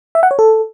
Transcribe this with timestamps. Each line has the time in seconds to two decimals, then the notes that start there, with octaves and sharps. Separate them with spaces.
0.15 E5
0.23 F#5
0.31 C#5
0.39 A4